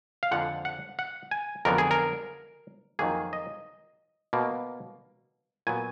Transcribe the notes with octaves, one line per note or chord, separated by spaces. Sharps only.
F5
F2 D3 F3 G#3 F#5
F#5
F#5
G#5
F2 D3 F#3 B3 A#4
G#4
A#4
F2 D#3 F#3 A#3 G#4
D#5
B2 A#3
A#2 F#3 B3 G#5